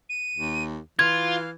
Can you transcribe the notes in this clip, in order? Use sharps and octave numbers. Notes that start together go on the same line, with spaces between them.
D#7
D#2
E3 F4 F5 G#6